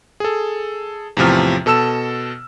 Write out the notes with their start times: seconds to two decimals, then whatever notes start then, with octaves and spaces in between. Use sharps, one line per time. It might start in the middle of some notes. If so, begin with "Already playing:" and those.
0.20 G#4 A4
1.17 E2 A2 C3 F3 F6
1.66 B2 A4 A5 E6 E7